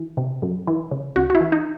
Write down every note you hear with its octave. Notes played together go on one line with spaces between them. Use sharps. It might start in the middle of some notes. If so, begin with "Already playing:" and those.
Already playing: E3
C3
F#2
E3
C#3
C#2 F#4
F#4
E4
E3
D#4